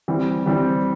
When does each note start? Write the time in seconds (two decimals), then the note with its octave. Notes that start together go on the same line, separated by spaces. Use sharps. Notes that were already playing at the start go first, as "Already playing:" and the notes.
0.08 E3 G3 C4
0.46 E3 G3 C4